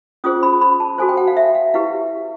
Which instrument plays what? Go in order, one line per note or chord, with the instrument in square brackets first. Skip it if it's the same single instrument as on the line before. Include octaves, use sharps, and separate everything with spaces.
[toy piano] C#4 F4 G#4 C5 D#6
B5
B5
A5
F#4 A4 C5 G#5
G5
F#5
F5
E5
F5
E4 G4 B4 F5